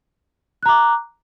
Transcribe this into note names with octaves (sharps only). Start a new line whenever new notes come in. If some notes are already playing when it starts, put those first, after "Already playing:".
A#5 D6 F#6